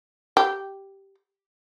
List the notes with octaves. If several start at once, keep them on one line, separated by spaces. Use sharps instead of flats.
G4